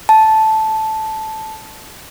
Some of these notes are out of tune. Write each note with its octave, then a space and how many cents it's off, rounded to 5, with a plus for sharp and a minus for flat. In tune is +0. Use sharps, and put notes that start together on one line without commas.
A5 -5